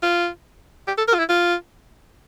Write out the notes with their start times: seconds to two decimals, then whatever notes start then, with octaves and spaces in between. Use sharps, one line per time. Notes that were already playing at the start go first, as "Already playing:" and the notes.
0.03 F4
0.87 G4
0.98 A4
1.08 A#4
1.14 F4
1.19 E4
1.29 F4